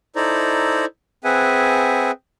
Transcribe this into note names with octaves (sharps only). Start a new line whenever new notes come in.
D#4 E4 A4 C5 D5 A#5
C4 G#4 B4 E5 F#5 G#5